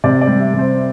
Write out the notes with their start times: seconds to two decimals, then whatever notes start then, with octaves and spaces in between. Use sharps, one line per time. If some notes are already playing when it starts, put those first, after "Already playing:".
0.04 C3 D5
0.21 D5
0.27 G3
0.40 E5
0.54 C3
0.59 C5